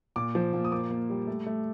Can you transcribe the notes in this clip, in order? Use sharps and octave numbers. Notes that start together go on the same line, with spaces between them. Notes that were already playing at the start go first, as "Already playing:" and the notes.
A#2 D6
F3
A#2
D#6
A#3 D6
A#3
G3
A3
A3